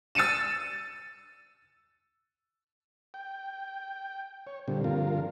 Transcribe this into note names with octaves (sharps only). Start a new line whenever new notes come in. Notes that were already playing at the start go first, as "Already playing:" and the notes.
E6 A6 C#7 D#7 E7
G5
C#5
A#2 D3 G3 C4
G2 D3 F3 F4 A#4